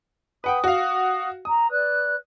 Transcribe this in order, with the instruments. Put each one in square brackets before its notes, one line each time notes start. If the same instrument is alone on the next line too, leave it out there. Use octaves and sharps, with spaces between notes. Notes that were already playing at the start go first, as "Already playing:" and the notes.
[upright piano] B4 F#5 G5 [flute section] D#6
[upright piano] F#4 F5
[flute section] A#5 [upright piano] D#6
[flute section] B4 D5 F#6